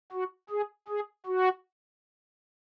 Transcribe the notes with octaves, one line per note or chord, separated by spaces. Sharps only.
F#4
G#4
G#4
F#4